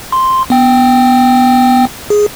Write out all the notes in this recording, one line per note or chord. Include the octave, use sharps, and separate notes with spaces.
C6
B3 G5
G#4